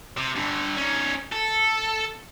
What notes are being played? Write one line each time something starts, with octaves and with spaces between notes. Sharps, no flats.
C3
G2 D3
C#4 D#4
A4